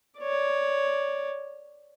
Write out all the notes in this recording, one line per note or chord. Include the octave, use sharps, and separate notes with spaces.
C#5 D5